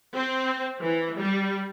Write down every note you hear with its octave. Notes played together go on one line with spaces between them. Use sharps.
C4
E3
G3